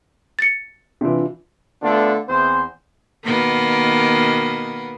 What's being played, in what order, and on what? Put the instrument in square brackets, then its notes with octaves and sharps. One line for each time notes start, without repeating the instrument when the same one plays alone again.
[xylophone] A6 C#7
[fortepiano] C3 E3 [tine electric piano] D4 F4
[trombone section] D3 A3 B3 D4 F4 A4
E2 C4 C5
[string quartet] B2 D#3 A#3 B3